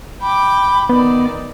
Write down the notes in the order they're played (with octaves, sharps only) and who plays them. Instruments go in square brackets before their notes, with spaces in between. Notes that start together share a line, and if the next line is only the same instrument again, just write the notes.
[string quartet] G5 D6 [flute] B5
[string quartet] D#3 D5 [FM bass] B3